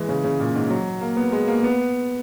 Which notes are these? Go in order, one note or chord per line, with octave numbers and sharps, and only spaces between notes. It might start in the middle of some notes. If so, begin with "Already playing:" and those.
Already playing: E3 G#3
C#3
C#3
A#2
G#2
F#3
A#3
B3
G#3
A#3
B3